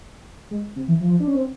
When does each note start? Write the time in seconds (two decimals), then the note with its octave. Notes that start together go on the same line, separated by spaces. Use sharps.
0.51 G#3
0.76 C3
0.88 E3
1.00 F3
1.20 D4
1.27 C#4
1.35 C4